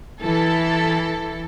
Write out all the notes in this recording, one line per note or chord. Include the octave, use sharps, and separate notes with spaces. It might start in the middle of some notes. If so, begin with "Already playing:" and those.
E3 A4